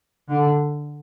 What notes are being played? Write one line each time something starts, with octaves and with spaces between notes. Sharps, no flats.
D3